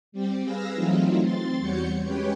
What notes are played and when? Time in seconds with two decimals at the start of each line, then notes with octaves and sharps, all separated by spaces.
0.12 G3 C4 G4
0.44 G#4 B4 F5 E6 A#6
0.74 E3 F#3 A3 C4 D#4 F4
1.22 C4 C6 A6
1.60 E2 G3 F#4 C#5 G6 C#7
2.02 G#3 C#4 G4 B4 C#5 G5